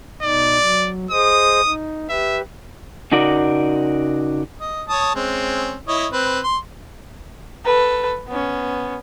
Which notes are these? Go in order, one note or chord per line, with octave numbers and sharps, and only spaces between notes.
B2 D#4 D5
F#3
G#4 C5 D#5 D#6
D#4
G4 B4 E5
C#3 D#4 F#4 A#4 D5
D#5
C#5 A5 D#6
G#3 C4 C#4
E4 C#5 D#5
C4 B4
C6
A4 B4
B3 C#4